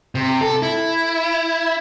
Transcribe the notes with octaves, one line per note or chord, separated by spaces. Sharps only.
C3
A4
E4